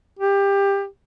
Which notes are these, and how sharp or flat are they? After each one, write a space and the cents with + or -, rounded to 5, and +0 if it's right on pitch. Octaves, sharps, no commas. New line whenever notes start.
G4 +20